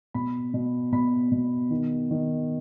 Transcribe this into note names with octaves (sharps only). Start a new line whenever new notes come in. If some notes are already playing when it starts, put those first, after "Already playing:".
B2 B5
B2
B2 B5
B2
D#3
D#3